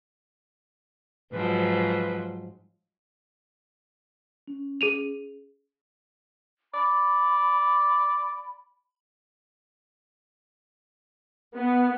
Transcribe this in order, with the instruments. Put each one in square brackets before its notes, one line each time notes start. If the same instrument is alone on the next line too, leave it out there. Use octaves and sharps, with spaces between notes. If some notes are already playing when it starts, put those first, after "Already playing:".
[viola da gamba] G#2 F3 F#3 [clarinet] B4
[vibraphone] C#4
[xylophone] G#4 D#7 F7
[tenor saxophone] D5 [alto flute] B5
[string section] B3